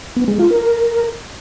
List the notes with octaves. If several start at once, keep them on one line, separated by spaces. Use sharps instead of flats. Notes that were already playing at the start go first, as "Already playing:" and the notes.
B3
G#3
F4
A#4